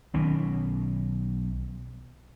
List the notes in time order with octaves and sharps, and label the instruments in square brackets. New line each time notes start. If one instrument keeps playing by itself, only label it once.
[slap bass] B1 B2 [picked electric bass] D#3 B3 C#4